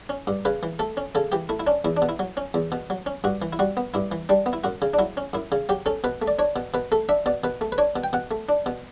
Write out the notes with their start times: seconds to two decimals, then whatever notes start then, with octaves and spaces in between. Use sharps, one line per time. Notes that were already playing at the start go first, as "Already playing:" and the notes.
0.09 C#4
0.27 G2
0.45 C#3 B4
0.63 E3
0.79 A3 A4
0.97 C#4
1.15 C#3 A4
1.32 E3 G4
1.49 A3 E4
1.60 E4
1.67 C#4 D4
1.85 E2 E4
1.97 D4
2.02 B2
2.09 E4
2.19 F#3
2.37 C#4
2.54 E2
2.72 B2
2.90 F#3
3.06 C#4
3.24 G2 F#4
3.42 E3
3.53 E4
3.59 G3 F#4
3.77 B3
3.94 G2 E4
4.12 E3
4.29 G3 D4
4.46 B3
4.53 E4
4.64 F#2 F#4
4.82 C#3
4.94 D4
4.99 F#3 E4
5.17 C#4
5.33 F#2 E4
5.52 C#3
5.69 F#3 G4
5.86 C#4 A4
6.04 B2 B4
6.22 A3
6.28 D5
6.39 D4 C#5
6.56 B2
6.74 B2 B4
6.92 A3 A4
7.09 D4 E5
7.26 B2 D5
7.44 B2 B4
7.61 A3
7.72 B4
7.78 D4 C#5
7.96 B2
8.04 G5
8.13 B2 F#5
8.31 A3
8.49 D4
8.66 B2